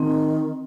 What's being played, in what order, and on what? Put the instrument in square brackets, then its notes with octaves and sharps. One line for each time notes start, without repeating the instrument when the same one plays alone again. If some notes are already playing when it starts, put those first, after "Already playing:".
Already playing: [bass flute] D#3 [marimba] C4